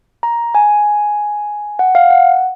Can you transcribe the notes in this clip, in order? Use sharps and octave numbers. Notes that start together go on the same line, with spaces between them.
A#5
G#5
F#5
F5
F#5